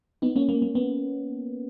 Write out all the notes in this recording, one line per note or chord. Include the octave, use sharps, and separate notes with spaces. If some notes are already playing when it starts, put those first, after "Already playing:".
B3 D#4
A#3 C#4
A#3
A#3
B3